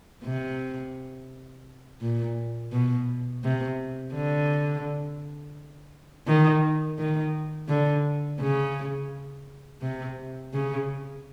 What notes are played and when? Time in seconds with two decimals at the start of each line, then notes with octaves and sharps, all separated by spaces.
0.24 C3
2.01 A#2
2.72 B2
3.43 C3
4.14 D3
6.27 D#3
6.98 D#3
7.68 D3
8.40 C#3
9.82 C3
10.53 C#3